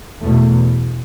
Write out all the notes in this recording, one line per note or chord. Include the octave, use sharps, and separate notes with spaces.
E2 B2 A3